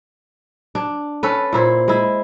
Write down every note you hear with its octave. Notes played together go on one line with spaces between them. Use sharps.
D4
C#4 A4 B4
A#2 E4 C5
G#3 E4